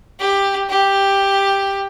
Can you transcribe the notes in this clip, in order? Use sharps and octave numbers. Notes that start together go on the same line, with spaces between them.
G4
G4